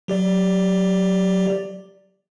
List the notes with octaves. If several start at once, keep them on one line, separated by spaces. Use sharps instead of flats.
F#3 G4 D5